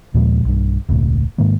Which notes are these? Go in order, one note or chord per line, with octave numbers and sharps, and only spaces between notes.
D#2 A#2 F3 G#3
B1 G2
E1 C#2 A2
G#2 D#3 G#3 A#3